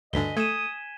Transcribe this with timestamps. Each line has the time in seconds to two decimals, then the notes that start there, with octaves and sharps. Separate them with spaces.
0.13 D2 G2 D3 D#5 G#5 B6 G7
0.37 A3 D#6 G#6 D#7 E7